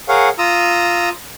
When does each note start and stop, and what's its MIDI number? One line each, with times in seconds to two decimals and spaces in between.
0.09 0.29 68
0.09 0.29 70
0.09 0.29 73
0.09 0.29 77
0.09 0.29 78
0.39 1.09 65
0.39 1.09 82
0.39 1.09 87
0.39 1.09 88